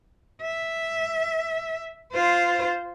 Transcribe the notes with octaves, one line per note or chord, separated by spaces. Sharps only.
E5
F4 C5